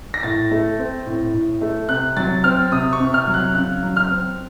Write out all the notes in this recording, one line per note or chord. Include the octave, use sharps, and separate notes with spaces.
A#6
A2 A6
A3
C4
A2
A2
A3
C3 F#6
F#3 A6
C4 F6
C3 D#6
C#6
C3
F6
F#3
F#6
C#3 F#6
F#3
F6
C4